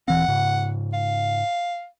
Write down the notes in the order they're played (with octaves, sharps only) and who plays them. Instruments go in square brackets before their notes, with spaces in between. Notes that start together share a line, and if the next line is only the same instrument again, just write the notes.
[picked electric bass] D#1 E3 C4 [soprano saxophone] F#5
[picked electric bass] G#2 C#3
[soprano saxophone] F5